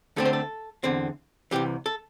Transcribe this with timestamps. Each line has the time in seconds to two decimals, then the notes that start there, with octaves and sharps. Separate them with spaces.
0.16 D2 D3 A3 C4 A4
0.25 C5
0.33 A4
0.84 E2 D3 C4
1.51 C2 C3 E3 G4
1.86 A4